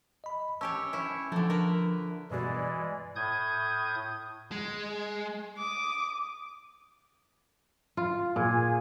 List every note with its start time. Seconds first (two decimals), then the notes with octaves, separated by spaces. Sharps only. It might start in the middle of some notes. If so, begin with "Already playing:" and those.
0.24 D#5 B5
0.61 C#4 G4 C#5 A5 E6
0.93 C#4 E4
1.32 D3 F3 A3
1.50 A#4 B4
2.31 G2 B2 E3 G#3 F#4 D5
3.16 A2 D#6 G6 G#6
4.52 G#3
5.58 D6 D#6
7.97 F4
8.36 A#2 G#4